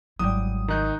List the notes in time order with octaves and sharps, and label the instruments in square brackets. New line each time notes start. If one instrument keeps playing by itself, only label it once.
[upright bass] G#1 E4 [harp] F#3 G3 [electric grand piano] D#6
[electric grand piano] D#3 D#4 [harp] A#5 F#6 G6